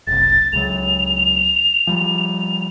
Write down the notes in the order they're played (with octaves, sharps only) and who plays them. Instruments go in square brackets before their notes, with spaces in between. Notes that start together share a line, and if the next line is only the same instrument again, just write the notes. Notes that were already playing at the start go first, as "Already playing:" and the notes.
[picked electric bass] F#1 C2 [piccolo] A6
[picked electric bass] C#2 C#3 F#3 [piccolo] F7
[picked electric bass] F3 G3